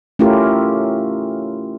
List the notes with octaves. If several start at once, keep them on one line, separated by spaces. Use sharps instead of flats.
A3 C#4 E4 F4 G4 A#4